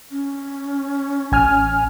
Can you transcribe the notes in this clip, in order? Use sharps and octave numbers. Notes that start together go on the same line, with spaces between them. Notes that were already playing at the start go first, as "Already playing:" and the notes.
C#4
A1 G#5 F6